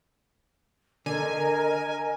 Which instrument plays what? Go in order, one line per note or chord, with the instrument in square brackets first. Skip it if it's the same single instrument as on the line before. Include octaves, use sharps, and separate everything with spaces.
[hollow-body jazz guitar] D3 [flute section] A#4 D#5 [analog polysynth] G#5